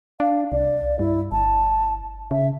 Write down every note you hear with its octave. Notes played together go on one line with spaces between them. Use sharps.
D4 F5
C2 D5
G2 E4
G1 A5
C#3 E5